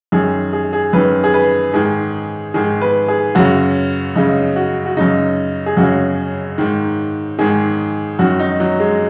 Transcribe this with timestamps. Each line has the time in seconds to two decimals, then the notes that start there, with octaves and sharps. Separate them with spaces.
0.12 F#2 D#3 G#4
0.53 G#4
0.73 G#4
0.93 F#2 D#3 B4
1.24 G#4
1.34 B4
1.73 G#2 D#3 G#4
2.54 G#2 D#3 G#4
2.81 B4
3.08 G#4
3.35 F#2 C#3 F#4
4.16 F#2 C#3 D#4
4.56 F#4
4.86 F#4
4.97 F#2 C#3 D#4
5.66 G#4
5.77 F#2 C#3 F#4
6.58 G#2 D#3
7.39 G#2 D#3 G#4
8.19 F#2 D#3 F#4
8.39 D#4
8.60 F#3
8.80 G#3